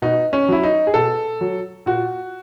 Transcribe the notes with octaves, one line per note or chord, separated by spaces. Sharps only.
B2 D#4
C#4
F#3 E4
D#4
G#4
B2 A4
F#3
A#2 F#4